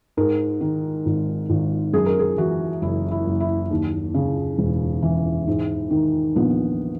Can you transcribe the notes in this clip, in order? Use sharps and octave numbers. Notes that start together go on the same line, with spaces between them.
G#2 A#4
D#3
G#1
G#1
F#2 G#4
A#4
G#4
E3 F#4
F#1 E4
E4
F#1
E4
D#2
C#3
E1
E3
G#2
D#3
A#1 B3